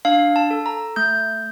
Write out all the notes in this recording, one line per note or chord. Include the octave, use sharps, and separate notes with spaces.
D4 F5
A5
A4
A#5
A3 G6